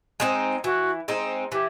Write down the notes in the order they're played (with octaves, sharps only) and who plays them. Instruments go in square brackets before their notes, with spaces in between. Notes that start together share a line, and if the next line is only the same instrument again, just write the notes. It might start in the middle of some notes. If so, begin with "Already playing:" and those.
[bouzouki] G#3 C4 D#4
[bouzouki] E3 [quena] F#4
[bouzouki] G#3 C4 D#4
[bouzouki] E3 [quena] G4